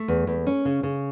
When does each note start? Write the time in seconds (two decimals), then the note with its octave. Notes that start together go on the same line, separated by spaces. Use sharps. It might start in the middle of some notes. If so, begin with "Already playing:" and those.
Already playing: A3
0.08 E2
0.27 E2
0.46 C#4
0.65 C#3
0.83 C#3